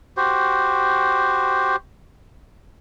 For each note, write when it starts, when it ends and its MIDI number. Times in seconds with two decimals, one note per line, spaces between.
0.17 1.76 66
0.17 1.76 67
0.17 1.76 72